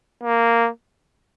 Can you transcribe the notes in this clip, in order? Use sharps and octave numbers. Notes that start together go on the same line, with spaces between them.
A#3